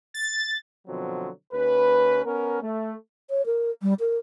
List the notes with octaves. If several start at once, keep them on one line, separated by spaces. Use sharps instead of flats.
A6
B2 D3 F3 F#3 C4
D#2 C#4 B4
B3 C#4 A#4
A3
C#5
A#4
G3
A#4